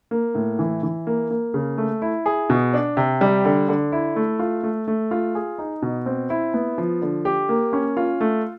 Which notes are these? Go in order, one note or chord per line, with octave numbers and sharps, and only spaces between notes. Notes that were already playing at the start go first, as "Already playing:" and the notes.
A#3
A2
E3
E3
A#3
A#3
C#3
A3
E4
G#4
B2
D4
C3
G3
D3
D3
E4
A3
F4
A3
A3
F4
G#4
D#4
B2
C4
E4
B3
F3
D3
G4
A#3
C#4
F4
A3